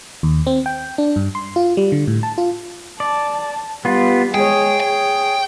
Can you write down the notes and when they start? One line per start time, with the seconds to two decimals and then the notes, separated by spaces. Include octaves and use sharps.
0.23 D#2
0.47 C4
0.66 G5
0.98 D4
1.16 G2
1.35 C6
1.56 F4
1.77 G3
1.92 D3
2.07 A2
2.23 A5
2.38 F4
3.00 D5 A5
3.85 G3 B3 F4
4.34 G#3 G#4 C#5 G5
4.80 C#5 G5